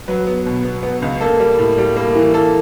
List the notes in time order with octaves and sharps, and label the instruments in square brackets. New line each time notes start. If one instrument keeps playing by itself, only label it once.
[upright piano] F#3 B4
B3
B2
B3
B3
C#2
A#3 A4
G3
A2
G3
A#3
E3
A#3 A4